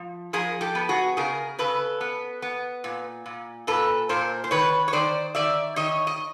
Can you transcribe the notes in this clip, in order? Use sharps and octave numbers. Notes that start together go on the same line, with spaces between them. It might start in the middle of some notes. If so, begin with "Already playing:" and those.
Already playing: F3
F3 G#4 A#4
G4 A4
B3
F#4 G#4
C#3 G#4 A#4
C#3 A4 B4
B3
B3
A#2
A#2
A#2 A4 B4
A#2 A#4 C5
C5
D#3 B4 C#5
C#5
D#3 C5 D5
D#3 D5 E5
D#3 C#5 D#5
D#5